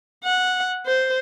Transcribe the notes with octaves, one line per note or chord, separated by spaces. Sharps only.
F#5
C5